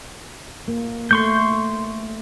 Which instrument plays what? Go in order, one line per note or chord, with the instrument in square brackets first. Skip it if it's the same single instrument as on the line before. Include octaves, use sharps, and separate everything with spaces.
[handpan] A#3
[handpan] A3 [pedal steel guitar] C6 C#6 G6